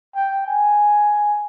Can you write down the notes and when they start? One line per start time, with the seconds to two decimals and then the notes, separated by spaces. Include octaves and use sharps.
0.15 G5
0.46 G#5